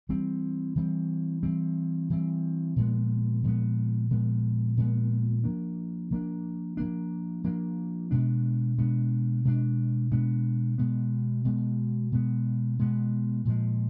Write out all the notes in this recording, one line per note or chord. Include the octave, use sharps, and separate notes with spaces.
E3 G3 C4
E3 G3 C4
E3 G3 C4
E3 G3 C4
A#2 F3 G#3 B3
A#2 F3 G#3 B3
A#2 F3 G#3 B3
A#2 F3 G#3 B3
F3 A#3 D4
F3 A#3 D4
F3 A#3 D4
F3 A#3 D4
B2 G#3 B3 D4
B2 G#3 B3 D4
B2 G#3 B3 D4
B2 G#3 B3 D4
B2 G#3 B3
B2 G#3 B3
B2 G#3 B3
B2 G#3 B3
A#2 F3 G#3